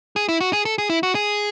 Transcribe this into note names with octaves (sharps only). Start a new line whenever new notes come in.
G#4
E4
F#4
G#4
A4
G#4
E4
F#4
G#4